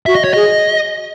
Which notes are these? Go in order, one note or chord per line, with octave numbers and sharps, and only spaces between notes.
F#4 E5
D#5
C#5
G#4 D#5